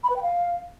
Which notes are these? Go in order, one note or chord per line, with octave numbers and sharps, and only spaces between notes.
B5
B4
G5
F5